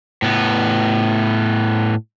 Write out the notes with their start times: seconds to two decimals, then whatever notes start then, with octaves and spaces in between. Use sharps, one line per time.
0.22 A2 B3